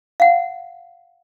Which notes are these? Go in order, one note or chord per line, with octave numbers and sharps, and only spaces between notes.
F5 F#5